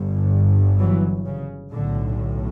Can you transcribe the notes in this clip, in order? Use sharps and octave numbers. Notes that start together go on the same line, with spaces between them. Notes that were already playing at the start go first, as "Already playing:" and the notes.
Already playing: G1 G2
E3 F#3
C#3
B1 A2 D3